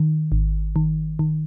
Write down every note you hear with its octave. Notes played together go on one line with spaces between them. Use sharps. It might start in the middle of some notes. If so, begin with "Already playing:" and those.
Already playing: D#3
G#1
D#3
D#3